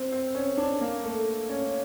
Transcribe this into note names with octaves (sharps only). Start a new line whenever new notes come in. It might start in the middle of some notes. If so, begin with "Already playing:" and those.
Already playing: C4
C4
C#4
D4
A#3
A3
C#4